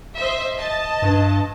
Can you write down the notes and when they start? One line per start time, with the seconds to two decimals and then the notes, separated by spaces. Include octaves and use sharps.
0.16 C5 D#5 E5
0.57 D#5 A5
1.02 G2